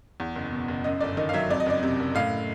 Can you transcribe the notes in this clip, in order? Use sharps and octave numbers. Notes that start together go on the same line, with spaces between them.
E2
F#1
B2
F#1
F#2 D#5
G1 D5
D#3 D#5
F5
F#3 E5
F2 D5
D#5
F#1 D5
C3
F#1
A2 F5